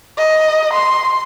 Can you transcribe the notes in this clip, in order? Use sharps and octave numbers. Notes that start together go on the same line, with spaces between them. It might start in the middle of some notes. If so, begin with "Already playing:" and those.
D#5
C6